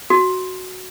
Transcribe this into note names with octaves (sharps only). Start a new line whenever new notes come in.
F#4